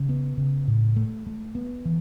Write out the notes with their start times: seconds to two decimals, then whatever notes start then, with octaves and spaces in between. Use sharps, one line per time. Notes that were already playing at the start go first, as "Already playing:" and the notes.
Already playing: C#3
0.09 B3
0.37 C#3
0.68 A2
0.96 A3
1.27 A3
1.55 B3
1.85 E3